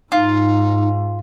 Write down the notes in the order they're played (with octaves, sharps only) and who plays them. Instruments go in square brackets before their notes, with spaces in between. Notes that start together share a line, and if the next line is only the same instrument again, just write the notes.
[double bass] G#2 [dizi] D#4 [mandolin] F4